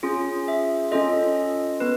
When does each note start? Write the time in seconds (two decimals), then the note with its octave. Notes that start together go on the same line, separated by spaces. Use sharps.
0.03 C#4 F4 G#4
0.48 E5
0.91 C#4 F4 A4 D#5
1.80 B3 B4